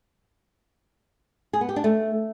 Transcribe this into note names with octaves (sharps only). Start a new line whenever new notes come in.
G#4
B3
G4
D4
A3